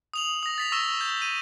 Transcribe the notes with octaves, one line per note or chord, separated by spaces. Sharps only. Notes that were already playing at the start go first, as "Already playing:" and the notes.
D#6 F7 F#7
D#6 A#6
A6 B6 F7
C#6 E6 A#6 E7 G7
G6
D#7